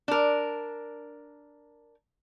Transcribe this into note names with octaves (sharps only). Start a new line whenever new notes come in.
D4 A#4